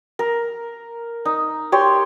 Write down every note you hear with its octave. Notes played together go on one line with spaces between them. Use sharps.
A#4
D#4
G4 C#5 C6